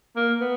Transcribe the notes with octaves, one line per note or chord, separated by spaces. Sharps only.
A#3
B3